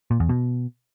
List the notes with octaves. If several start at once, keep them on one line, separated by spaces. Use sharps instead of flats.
A#2
E2
B2